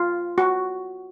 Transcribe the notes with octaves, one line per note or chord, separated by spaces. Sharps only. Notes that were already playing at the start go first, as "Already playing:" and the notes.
Already playing: F4
F#4